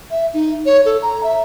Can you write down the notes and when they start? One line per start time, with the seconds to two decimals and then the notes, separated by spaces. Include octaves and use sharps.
0.11 E5
0.34 D#4
0.66 C#5
0.85 A4
1.02 A#5
1.23 E5